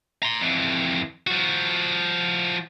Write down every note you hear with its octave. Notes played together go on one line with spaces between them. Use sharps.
A#5 C6
F2 E3
F3 F#4